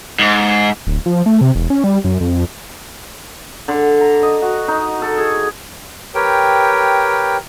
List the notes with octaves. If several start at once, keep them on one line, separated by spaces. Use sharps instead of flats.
G#2
D1
F3
A3
C3
E1
C#4
G3
F#2
F2
D3
A#5
D#5
F#4
D#4
A4
G#4
G4 A#4 B4 C#5 G5